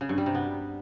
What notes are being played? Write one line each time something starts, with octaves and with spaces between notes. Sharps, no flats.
C#3
G2
G3
C3
B3